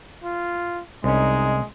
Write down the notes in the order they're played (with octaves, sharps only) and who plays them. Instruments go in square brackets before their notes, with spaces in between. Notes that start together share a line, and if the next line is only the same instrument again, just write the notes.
[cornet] F4
[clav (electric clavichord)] C2 C#4 [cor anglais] G#3 [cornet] D#4